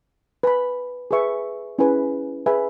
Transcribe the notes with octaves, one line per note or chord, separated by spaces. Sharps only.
B4 G#5 B5
G#4 B4 E5 C#6
C#4 E4 G#4 B4 G#5
G#4 B4 E5 G#5 B5